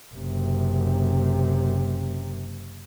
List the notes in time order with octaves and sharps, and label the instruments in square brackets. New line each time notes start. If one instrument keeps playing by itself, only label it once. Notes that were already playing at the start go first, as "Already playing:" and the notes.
[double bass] F#1 C3